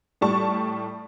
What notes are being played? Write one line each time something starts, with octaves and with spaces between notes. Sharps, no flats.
A2 G3 A5 C#6